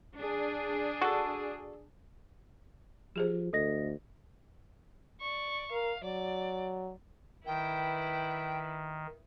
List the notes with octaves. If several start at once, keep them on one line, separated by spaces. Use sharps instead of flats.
D4 G#4
F#4 A4
F3 G4 G#4 C5
D2 A4 D#5 A#6
D5 C#6
A#4 F5
F#3 D5
D#3 E4 B4 G5